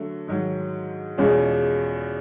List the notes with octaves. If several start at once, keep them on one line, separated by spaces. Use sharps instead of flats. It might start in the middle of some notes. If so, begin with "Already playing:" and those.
Already playing: D3 F#3 A3
G#2 D#3 F#3
E2 B2 G#3 C#4 F4